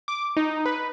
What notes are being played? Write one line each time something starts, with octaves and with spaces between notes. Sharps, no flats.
D6
D#4
B4